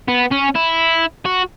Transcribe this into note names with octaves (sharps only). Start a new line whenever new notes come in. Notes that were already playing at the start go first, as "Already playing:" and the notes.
B3
C#4
E4
F#4